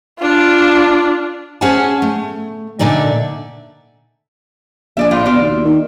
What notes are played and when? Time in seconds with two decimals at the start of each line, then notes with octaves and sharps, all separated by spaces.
0.19 D4 F4
1.61 C#4 G#4 C5 F#5 A5
2.02 A3
2.79 A#2 D3 D#4 D5 E5
4.97 A#1 G#4 D5 E5
5.11 A2 C4 F4
5.25 B2 F4 D5 E5
5.40 D#2
5.64 D#3